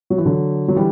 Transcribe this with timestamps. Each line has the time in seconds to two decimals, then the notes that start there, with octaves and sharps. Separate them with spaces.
0.10 F#3
0.18 E3
0.25 D3 F#3
0.68 F#3
0.76 E3 G3